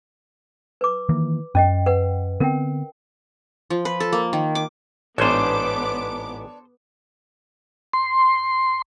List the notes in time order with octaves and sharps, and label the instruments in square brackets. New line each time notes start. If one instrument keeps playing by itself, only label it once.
[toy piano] B4 D6
[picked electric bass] D#3 E3 A#3
[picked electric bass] F#2 [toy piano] C#4 D#5 G5
[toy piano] B4 F#5
[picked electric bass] D3 B3 C4 [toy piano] A#4 G5
[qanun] F3
B4
A4
A#3
D#3
D6
[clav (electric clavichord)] A1 G#2 [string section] B3 D6 [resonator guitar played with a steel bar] D4 C#5 [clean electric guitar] A4 C5
[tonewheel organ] C6